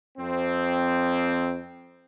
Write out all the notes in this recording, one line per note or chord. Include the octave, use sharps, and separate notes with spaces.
F2 C4